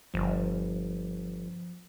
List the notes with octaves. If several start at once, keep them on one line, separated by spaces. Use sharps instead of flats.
G1 F3